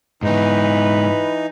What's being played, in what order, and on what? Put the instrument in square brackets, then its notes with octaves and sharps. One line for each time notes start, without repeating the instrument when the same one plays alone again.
[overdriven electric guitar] G#2 B3 [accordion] E3 D#4 [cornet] B4